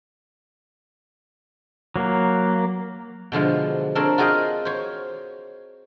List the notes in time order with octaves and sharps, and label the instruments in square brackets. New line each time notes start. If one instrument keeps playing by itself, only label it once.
[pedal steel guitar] F#3 A#3
[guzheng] B2 D3 F3 G#3
C4 D4 A4 A#4 C#5
F4 F#4 G#4 D#5 F5 G5
C5 C#5